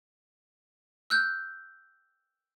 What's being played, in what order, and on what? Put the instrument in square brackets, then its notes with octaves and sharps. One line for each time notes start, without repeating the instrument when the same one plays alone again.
[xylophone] E6 F#6 G6